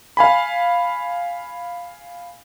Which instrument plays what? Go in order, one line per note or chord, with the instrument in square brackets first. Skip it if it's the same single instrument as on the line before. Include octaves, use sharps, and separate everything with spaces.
[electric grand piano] F5 G#5 B5